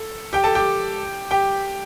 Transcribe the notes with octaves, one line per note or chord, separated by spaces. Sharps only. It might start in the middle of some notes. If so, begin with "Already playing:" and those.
Already playing: A4
G4 G5
A4 A5
G4 G5
G4 G5